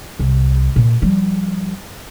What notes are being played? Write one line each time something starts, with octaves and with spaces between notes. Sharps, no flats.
C2
A#2
F3 G3